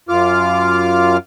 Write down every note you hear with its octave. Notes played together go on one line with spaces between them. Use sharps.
F#2 F4 D6 F6